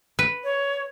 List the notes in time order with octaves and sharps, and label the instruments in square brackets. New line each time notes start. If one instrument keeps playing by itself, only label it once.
[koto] B4
[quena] C#5